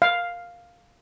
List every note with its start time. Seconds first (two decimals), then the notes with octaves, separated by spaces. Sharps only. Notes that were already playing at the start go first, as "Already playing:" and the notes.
0.02 F5